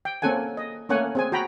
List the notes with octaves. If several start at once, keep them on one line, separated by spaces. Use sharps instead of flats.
G5
A#3 C4 C#4 A4 F#5 G#5
D#5
A3 A#3 C#4 C#5 F#5 G#5
C4 G#4 G#5
F#4 G5 A#5 B5